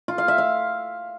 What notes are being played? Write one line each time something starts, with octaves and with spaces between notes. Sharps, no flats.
F4
F5
E5
F5